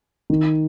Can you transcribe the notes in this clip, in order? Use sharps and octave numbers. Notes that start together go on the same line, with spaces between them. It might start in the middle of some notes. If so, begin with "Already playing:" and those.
D#3